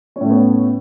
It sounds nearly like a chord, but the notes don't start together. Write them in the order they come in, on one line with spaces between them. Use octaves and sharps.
C#4 A2 A3 B3